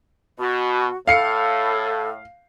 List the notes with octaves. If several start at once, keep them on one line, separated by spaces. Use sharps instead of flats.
B2 F#4
A2 A4 F5 C7 C#7